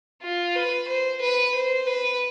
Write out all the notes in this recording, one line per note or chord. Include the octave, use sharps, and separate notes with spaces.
F4
B4
C5
B4
C5
B4